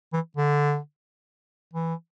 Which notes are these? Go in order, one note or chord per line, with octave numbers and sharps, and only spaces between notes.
E3
D3
E3